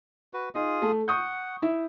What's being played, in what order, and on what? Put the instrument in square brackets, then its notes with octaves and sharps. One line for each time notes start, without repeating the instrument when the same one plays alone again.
[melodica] F#4 B4
[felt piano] D#4 [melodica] F4 G#4 D#6
[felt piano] A3
[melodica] F#5 [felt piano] C#6 D#6 G6
[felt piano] E4 E5